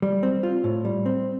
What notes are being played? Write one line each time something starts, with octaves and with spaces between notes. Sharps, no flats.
G3
C4
F4
A2
G3
C4